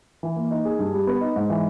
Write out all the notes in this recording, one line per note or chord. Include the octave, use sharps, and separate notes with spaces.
E3
A#3
D#4
G#4
G2
G3
B3
D#4
G#2
E3